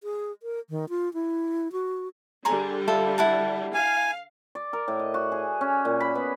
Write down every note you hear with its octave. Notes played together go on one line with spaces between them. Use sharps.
G#4
A#4
D#3
F4
E4
F#4
D3 G3 G#4 A#5 C6
E4 F4 A4
E4 F#5 A5
F5 G#5
D5
A#4
A2
D#5
F#4
G#4
C#4
A#2
B5
B3